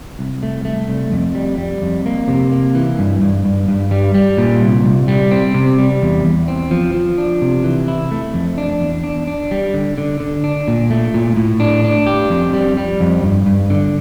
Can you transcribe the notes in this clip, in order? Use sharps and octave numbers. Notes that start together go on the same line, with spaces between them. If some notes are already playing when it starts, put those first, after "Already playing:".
C2
A3
A3
C2
F2
G3
G3
F2
A#3
C3
A#3
E3
G2
G2
G2
G2
G3
G3
A#2
C2
C2
G3
C4
C3
G3
E2
E2
C4
F3
F3
D4
C3
E3
E4
A3
F2
D4
E2
D4
D4
G3
D3
D3
D3
D4
A#2
A3
A#2
A2
D4
D4
G4
F2
G3
G3
F2
G2
G2
D3